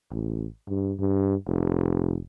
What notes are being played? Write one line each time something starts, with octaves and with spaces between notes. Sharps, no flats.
A1
G2
G2
F1